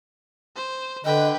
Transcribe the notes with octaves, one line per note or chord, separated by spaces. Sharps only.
C5
D3 B4 D#5 G5